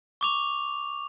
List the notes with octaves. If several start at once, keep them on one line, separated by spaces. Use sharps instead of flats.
C#6 D6 F7